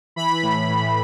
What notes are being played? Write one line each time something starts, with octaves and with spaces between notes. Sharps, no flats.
E3 B5
A2
A2